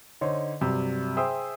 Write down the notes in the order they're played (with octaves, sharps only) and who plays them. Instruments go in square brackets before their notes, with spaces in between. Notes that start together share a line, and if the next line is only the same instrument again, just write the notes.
[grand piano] D3 D#4 C5 C#5
G2 C3 F#3
G#4 C5 E5 G5 D#6 E6